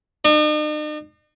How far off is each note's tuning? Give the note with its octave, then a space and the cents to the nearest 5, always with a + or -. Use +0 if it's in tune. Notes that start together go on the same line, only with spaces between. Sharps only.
D#4 -45